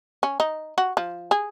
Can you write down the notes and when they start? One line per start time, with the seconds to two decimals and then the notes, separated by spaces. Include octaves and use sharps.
0.23 C#4
0.40 D#4
0.78 F#4
0.97 F3
1.31 G#4